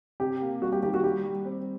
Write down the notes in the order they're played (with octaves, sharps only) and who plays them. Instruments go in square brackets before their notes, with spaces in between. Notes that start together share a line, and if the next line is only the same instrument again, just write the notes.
[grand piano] C3 [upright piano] G4
[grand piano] A#3
[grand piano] G3 [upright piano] F#4
[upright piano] G4
[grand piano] D#3 [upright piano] G4
[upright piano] F#4
[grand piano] G3 [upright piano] G4
[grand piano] G3
C4